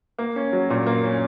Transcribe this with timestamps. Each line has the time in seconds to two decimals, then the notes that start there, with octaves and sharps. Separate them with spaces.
0.19 A#3
0.36 C#4
0.53 F#3
0.70 A#2
0.86 A#3
1.04 C#4